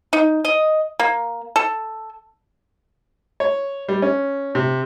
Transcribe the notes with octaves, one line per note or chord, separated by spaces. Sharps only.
D#4
D#5
A#3
A4
C#5
G3
C#4
C3